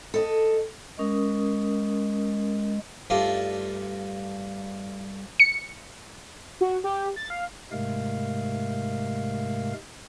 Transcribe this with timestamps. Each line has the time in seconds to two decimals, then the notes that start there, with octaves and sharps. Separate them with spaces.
0.14 A4 D#5
0.99 G#3 C#4 A#4 D#6
3.10 G2 A3 D#4 F4 D5
5.40 C#7
6.61 F#4
6.84 G4
7.16 A6
7.30 F5
7.72 G#2 C3 G#3 A3 A#4 F5